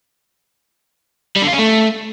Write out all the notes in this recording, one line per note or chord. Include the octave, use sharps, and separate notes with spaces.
G3
D3
F4
C#4
A3